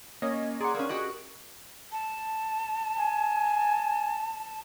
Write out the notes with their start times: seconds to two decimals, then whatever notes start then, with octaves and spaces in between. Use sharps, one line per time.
0.22 A#3 C#4 C#5 D#5
0.61 G#4 D5 F#5 A#5 C6 D6
0.75 A#3 C#4 A#4
0.89 F#4 G4 D#5 F#6
1.92 A5
2.97 G#5